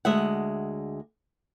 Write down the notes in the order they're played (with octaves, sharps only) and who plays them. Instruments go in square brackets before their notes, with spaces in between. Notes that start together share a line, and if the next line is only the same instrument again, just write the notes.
[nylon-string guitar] D2 G#3 E5 F#5